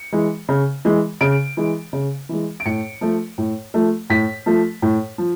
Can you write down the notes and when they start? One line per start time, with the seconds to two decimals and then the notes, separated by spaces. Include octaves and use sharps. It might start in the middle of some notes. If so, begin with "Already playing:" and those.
Already playing: C#7
0.12 E3 G#3
0.49 C#3
0.85 E3 G#3
1.21 C#3 D7
1.57 E3 G#3
1.93 C#3
2.29 E3 G#3
2.60 D7
2.66 A2 C#7
3.01 F3 A3
3.38 A2
3.74 F3 A3
4.10 A2 B6
4.46 F3 A3
4.82 A2
5.18 F3